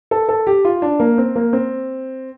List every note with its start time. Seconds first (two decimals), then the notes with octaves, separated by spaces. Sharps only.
0.11 A4
0.29 A4
0.47 G4
0.65 F4
0.82 D4
1.00 A#3
1.18 C4
1.35 A#3
1.53 C4